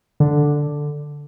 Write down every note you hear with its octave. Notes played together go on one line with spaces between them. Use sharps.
D3